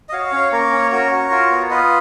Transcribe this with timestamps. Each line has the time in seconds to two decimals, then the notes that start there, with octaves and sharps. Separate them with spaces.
0.09 D#5
0.13 F#4 C#5 F5
0.33 C#4
0.52 A#3 A#4 C#5
0.72 C#4
0.91 F#4 A#4 C#5
1.11 F#4
1.31 F4
1.51 B3
1.70 F4 B4 D#5